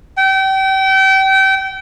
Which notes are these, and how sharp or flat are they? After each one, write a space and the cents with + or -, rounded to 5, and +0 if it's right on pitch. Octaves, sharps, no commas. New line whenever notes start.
G5 -30